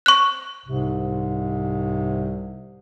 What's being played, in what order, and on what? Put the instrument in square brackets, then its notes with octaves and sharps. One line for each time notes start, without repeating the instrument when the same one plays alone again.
[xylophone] C#6 F#6
[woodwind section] C2 G#2 C3